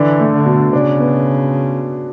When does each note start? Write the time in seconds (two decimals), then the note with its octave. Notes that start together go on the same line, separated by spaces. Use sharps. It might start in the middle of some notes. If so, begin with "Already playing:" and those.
Already playing: D3 E3 D4
0.20 A3
0.33 D3
0.46 B2
0.73 C#3 D4
0.99 B3